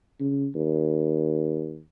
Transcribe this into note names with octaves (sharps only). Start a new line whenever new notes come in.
C#3
D#2